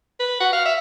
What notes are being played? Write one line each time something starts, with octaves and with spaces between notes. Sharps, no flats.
B4
F#4
F5
E5